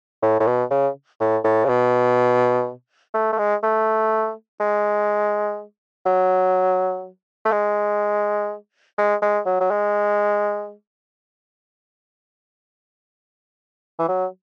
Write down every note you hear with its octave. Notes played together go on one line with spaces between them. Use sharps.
A2
A2
B2
C#3
A2
A2
C#3
B2
A3
A3
G#3
A3
G#3
F#3
A3
G#3
G#3
G#3
F#3
F#3
G#3
E3
F#3